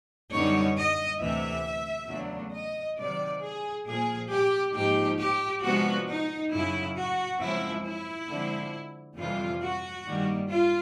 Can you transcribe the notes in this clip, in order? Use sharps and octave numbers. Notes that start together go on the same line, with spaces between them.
F#2 D3 G3 B3 D#4 C#5
D#5
D2 C3 E3 A3 E5
E2 C#3 F#3 A3 D4
D#5
C3 D#3 F#3 D5
G#4
A#2 F3 A#3 G#4
G4
G#2 F3 A#3 D#4 G4
G4
C3 F3 G#3 B3 D4 F#4
D#4
F#2 C#3 F#3 E4
F#4
F#2 C#3 F3 G#3 C4 E4
E4
D3 F3 G#3 C4
F2 C3 E3 G3 F4
F#4
G2 D#3 G3 A#3
F4